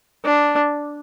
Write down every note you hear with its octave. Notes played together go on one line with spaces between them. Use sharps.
D4